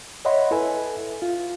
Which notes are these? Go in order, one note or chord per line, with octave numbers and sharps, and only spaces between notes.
C#5 D#5 E5 F#5 B5 C6
E4 A4 B4 E5 G#5
F4